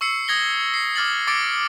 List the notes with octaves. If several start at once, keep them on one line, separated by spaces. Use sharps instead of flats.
C#6 E6 C7 C#7
D#6 G#6 A#6 G7
C7
D6 F6 A6 F#7
D6 A6 C#7 D7